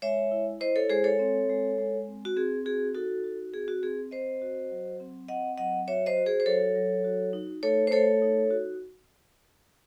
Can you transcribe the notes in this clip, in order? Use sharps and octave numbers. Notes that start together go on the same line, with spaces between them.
G#3 C#5 E5
E4
E4 C5 D#5
A4 C#5
G#3 G#4 C5
A4 C#5
C4
G#3
G#3
C4
F#4
C4 G#4
F#4 G#4
D#4 F#4 A4
F#4
C4 G#4
F#4
C4 G#4
C4 C5 D#5
F#4
F#3
C4
C4 D#5 F#5
F#3 D#5 F#5
F#4 C#5 E5
C5 D#5
F#4
G#4 C5
C5
F#3 A4 C#5
F#3
F#4
D#4
A3 A4 C#5
C5
A3 A4 C#5
D#4
F#4